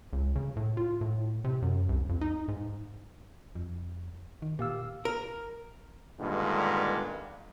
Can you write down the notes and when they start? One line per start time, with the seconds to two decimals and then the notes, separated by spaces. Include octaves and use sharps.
0.13 C#2
0.36 C#3
0.57 A2
0.77 F4
1.01 A2
1.44 C3
1.62 F#2
1.89 C2
2.09 F2
2.21 D#4
2.48 G#2
3.55 F2
4.42 D#3
4.59 A#2 G4 F5 E6
5.05 A#4
6.20 G2 A#2 D3 D#3 G#3 B3